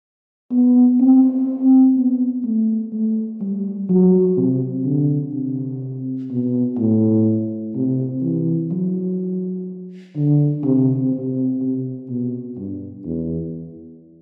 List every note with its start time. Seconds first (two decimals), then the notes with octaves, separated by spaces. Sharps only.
0.51 B3
1.00 C4
1.97 B3
2.44 A3
2.92 A3
3.41 G3
3.89 F#3
4.37 C3
4.85 D3
5.33 C3
6.31 B2
6.78 A2
7.75 C3
8.23 E3
8.72 F#3
10.16 D3
10.64 C3
11.12 C3
11.61 C3
12.10 B2
12.57 G2
13.05 E2